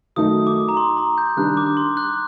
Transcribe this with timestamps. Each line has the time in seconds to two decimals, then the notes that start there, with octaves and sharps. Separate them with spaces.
0.16 F#2 D#3 F#3 A3 D#4 D#6
0.47 D6
0.69 A#5
0.77 C6
0.97 A#5
1.18 G6
1.37 D#3 G3 D4 F#6
1.57 D6
1.77 C6
1.97 F#6